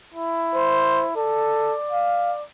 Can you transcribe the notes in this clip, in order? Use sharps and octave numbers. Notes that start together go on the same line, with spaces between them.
E4
C5
A4 D5
F5